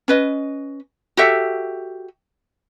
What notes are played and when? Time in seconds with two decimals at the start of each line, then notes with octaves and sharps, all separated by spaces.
0.08 C#4 B4 D#5
1.17 F#4 G4 A4 E5